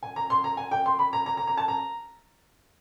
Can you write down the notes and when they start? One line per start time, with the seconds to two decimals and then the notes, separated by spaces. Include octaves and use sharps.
0.03 G#5
0.16 A#5
0.30 C6
0.44 A#5
0.57 G#5
0.71 G5
0.86 C6
0.99 B5
1.13 A#5
1.26 A#5
1.37 A#5
1.47 A#5
1.57 A5
1.68 A#5